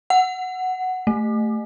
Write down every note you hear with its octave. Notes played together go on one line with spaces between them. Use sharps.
F#5
A3